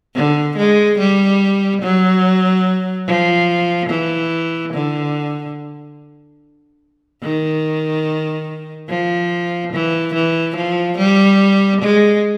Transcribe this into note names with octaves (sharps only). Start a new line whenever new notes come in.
D3
G#3
G3
F#3
F3
E3
D3
D#3
F3
E3
E3
F3
G3
G#3